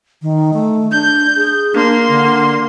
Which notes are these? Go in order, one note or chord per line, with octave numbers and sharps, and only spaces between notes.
D#3
A3
D4 G6
G#4
A#3 D4 C6
D3